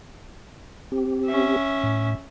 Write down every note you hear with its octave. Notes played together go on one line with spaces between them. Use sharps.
C4 G4
C#4 E5
A2